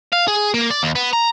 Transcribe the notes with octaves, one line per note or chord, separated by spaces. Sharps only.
F5
G#4
A#3
D5
D#2
B3
A#5